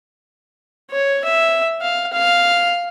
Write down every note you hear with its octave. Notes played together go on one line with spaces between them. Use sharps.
C#5
E5
F5
F5